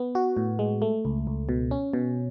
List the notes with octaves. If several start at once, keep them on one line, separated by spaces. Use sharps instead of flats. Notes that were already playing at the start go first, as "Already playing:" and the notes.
Already playing: B3
F#4
A2
G#3
A3
C#2
C#2
B2
C#4
B2